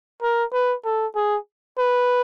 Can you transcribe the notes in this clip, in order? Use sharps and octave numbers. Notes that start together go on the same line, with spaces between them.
A#4
B4
A4
G#4
B4